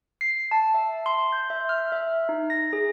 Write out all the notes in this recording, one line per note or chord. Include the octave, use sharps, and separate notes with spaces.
C7
A5
E5
C6
G6
E5
F6
E5
D#4
A#6
G#4